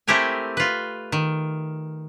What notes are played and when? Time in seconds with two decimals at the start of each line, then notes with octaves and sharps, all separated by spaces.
0.07 A3 C4 E4 G4 A#4 G#5
0.57 F4 B4
1.12 D#3